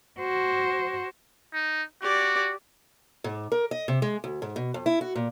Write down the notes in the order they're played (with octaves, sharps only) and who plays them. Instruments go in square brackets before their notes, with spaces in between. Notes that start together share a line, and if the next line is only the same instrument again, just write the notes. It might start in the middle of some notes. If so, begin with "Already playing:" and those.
[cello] F#4 C5
[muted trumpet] D#4
[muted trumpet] F#4 [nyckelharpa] G4 D5
[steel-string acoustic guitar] G#2
A#4
D#5
C3
G#3
D2
G#2
B2
F2
E4
F#4
A#2